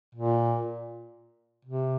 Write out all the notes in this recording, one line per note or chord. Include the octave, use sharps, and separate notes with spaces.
A#2
C3